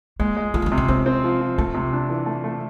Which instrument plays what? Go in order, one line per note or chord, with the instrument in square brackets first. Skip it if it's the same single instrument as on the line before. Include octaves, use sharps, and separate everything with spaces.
[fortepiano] G#3 [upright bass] A#3
[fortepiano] G#3
[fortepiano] F3 [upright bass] A3
[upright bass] B3
A#3
[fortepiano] C3
[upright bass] C4
[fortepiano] C4 [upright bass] C#4
[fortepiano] C4
F3
F3
[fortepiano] A3 [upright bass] C4
[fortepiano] C3
D4
E3
A3
A3